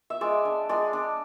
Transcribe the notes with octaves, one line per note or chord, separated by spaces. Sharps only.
E5
G#3 D5
D4
G#3 D5
D4